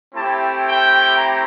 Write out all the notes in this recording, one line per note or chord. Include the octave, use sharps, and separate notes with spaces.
A3 C4 E4 G4 A5
G5
A#5